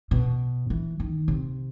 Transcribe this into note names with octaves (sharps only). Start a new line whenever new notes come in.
B2
E3
D#3
C3